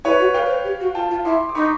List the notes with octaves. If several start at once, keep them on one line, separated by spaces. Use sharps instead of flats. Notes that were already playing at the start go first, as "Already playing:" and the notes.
E4 B4 C#5
F#4
B4 F5 G5
C#5
C5
G4
F#4
F4 G5 A5
F4
E4 C6 D6
D6
D#4 B5 C#6